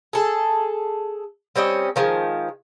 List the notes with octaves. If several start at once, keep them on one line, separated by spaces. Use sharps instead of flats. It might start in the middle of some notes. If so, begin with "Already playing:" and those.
G#4 A4
G3 C4 C#4 D#5
D#3 F3 G#3